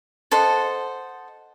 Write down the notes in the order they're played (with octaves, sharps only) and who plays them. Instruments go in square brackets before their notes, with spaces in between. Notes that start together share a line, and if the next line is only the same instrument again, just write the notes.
[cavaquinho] A4 C5 D#5 F#5